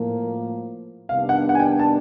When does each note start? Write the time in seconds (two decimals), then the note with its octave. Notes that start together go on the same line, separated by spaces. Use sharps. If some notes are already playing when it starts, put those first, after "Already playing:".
Already playing: A2 F3 A#3
1.09 C3 D#3 G3 B3 D4 F5
1.29 F#5
1.49 F#5
1.55 G#5
1.60 G5
1.79 A5